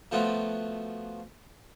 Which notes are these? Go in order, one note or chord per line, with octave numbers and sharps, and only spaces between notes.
F3 A3 B3 F4 F#4